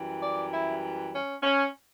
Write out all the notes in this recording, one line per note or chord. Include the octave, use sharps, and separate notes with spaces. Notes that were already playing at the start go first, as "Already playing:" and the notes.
Already playing: F#2 E3 G3
D5
E4
C#4
C#4